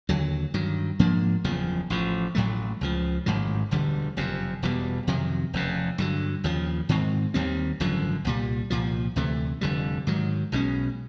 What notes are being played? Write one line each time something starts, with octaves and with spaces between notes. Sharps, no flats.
D#2 D3 F#3
G2 D#3 F#3
G#2 F3 A#3 D4
F#1 E2 C#3 F3
A1 A2 F3
A1 A2 F#3 A3
C#2 C#3 F3
A1 G#2 D#3 F#3
E1 D2 D3 G3
F#1 F2 C3
E1 E2 B2 G3
F2 C3 D#3 F#3
F1 E2 C#3
G2 D3 F#3
D#2 C#3 F3
G#2 D#3 G#3 C4
D#2 D#3 G3 C4
G#1 F#2 D3 F3
C2 A#2 G3
C2 A#2 F3
D2 C3 E3 A3
F1 F2 D3 G3
G#2 D#3 F#3
B1 B2 G#3 C#4